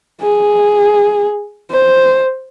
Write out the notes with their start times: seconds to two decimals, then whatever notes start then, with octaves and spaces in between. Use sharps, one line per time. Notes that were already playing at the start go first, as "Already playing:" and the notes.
0.21 G#4
1.71 C5